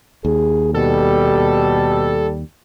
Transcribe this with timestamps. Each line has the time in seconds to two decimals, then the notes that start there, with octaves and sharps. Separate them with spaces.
0.25 D#2 G#4
0.74 B2 G3 A4